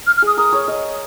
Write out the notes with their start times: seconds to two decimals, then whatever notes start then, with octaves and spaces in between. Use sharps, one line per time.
0.07 F6
0.17 F6
0.22 G#4 D#6
0.37 A#4 D#6
0.53 C#5
0.68 D#5